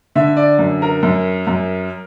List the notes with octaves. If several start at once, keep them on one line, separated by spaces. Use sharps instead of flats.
D3 E5
D5
F#2
A#4
F#2
F#2